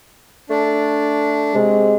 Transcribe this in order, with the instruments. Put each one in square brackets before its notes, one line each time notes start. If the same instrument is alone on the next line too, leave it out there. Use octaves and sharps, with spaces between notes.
[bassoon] A3 [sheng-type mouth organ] D4
[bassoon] C3 [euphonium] G#3